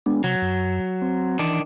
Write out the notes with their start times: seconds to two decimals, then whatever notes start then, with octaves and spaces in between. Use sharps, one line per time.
0.06 G#3 B3 D4
0.24 C3 F#3
0.42 F#2
1.02 C4
1.39 D#3 E3 D4